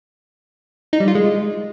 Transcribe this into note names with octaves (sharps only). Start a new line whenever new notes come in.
D#4
G3
F4
G#3